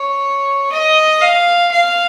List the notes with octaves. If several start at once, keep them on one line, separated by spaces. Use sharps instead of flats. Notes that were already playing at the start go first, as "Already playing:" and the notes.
Already playing: C#5
D#5
F5
F5